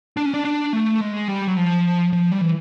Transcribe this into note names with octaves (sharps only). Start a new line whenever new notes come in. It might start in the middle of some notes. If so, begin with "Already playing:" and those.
D4
C#4
D4
D4
A3
G#3
G3
F#3
F3
F3
G3
E3